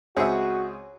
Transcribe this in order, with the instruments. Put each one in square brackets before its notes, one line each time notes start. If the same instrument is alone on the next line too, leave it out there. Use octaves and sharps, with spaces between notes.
[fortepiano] C#2 C4 G#4 [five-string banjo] C#4 E5 [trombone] F#4